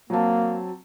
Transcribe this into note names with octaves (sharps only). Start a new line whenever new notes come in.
F#3 A#3 C4 A5